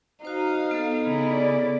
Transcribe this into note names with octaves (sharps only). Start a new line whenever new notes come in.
D#4 F#4 C5 F5
B3 A4
C#3 E4
D5